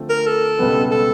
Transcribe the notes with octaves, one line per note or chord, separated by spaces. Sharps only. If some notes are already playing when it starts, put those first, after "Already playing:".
Already playing: D3 F3 A3 C4
A#4
A4
C#2 B2 G3 B3
A4